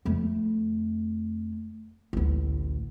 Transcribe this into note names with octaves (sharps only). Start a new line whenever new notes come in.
F2 A3
A1 D2